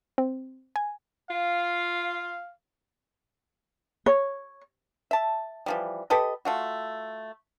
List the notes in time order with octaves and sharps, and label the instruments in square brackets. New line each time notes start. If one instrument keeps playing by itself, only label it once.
[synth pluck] C4
G#5
[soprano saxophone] F4 [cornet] F5
[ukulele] C#5
[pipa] E5 A5
E3 F3 G3
G4 A4 B4 D#5
A3 F4 F#4